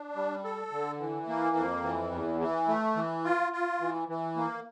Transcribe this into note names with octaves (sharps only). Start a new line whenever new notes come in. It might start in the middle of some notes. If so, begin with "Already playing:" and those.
Already playing: D4
G3
A4
D3
E3
A#3
F2
E3
E2
E3
A3
E3
F4
F4
E3
E3
A#3